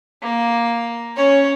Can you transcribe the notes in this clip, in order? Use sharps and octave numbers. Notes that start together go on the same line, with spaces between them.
A#3
C#4 C#5